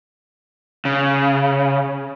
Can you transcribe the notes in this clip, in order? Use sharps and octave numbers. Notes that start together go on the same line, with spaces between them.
C#3